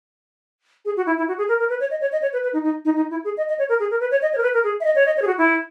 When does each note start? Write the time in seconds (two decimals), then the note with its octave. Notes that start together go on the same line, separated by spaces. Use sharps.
0.85 G#4
0.97 F#4
1.06 E4
1.18 E4
1.28 F#4
1.38 G#4
1.49 A#4
1.59 A#4
1.70 B4
1.80 C#5
1.91 D#5
2.01 C#5
2.12 D#5
2.22 C#5
2.33 B4
2.43 B4
2.53 D#4
2.64 D#4
2.85 D#4
2.96 D#4
3.10 E4
3.24 G#4
3.37 D#5
3.49 D#5
3.59 C#5
3.69 A#4
3.80 G#4
3.91 A#4
4.00 B4
4.11 C#5
4.22 D#5
4.33 C#5
4.38 A#4
4.43 B4
4.54 A#4
4.64 G#4
4.80 E5
4.85 D#5
4.96 C#5
5.06 D#5
5.17 C#5
5.22 G#4
5.27 F#4
5.38 E4